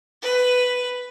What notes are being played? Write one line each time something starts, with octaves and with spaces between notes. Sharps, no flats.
B4